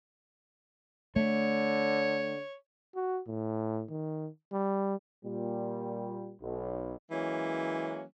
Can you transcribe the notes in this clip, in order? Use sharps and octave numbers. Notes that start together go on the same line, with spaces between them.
D3 A3 C#5
F#4
A2
D#3
G3
A#2 G3
B1
E3 F#3 G#3 A#3 C#4